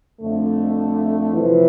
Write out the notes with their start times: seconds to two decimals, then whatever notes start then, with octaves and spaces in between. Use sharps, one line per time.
0.20 F2 D3 A3
1.34 E2 C3 E3 F3